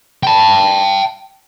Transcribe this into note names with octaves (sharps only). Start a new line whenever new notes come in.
G5 A5